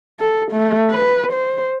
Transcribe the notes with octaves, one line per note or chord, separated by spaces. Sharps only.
A4
A3
B4
C5